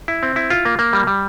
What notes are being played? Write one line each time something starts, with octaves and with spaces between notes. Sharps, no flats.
E4
C4
E4
F4
A#3
A#3
G3
G3